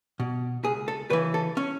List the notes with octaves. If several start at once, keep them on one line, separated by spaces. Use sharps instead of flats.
B2
C#2 G#4
A4
C#3 E3 B4
A4
C#4